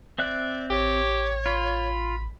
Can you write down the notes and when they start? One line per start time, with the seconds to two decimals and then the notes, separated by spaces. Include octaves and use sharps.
0.18 C4 D5 E5 F#6
0.70 A1 G4 C#5
1.46 F4 B5